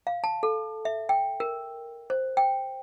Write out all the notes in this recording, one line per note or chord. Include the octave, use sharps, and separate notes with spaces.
F5
A5
A4
E5
G5
A#4
C5
G5